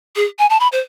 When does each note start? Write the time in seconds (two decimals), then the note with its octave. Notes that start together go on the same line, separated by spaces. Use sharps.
0.16 G#4
0.39 G#5
0.50 A5
0.60 B5
0.72 C5